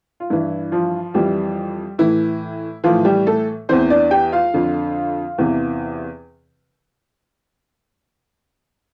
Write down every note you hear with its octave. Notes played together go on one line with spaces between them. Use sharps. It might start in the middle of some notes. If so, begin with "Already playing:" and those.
F4
G2 E3 E4
F3 F4
F2 E3 G3 G4
A2 E3 E4
A2 E3 F3 F4
G3 G4
A3 A4
E2 E3 C4 C5
D4 D5
G4 G5
F4 F5
F2 D3
E2 C3 E3